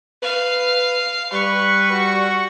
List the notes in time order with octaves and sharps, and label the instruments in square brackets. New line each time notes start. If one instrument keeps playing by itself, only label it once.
[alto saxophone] B4 [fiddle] F5
[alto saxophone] G3 [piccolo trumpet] B4 [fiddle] C#6
[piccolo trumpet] F#4